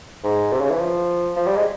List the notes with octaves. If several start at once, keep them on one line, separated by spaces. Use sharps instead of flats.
G#2
C3
C#3
E3
F3
F3
G3
G#3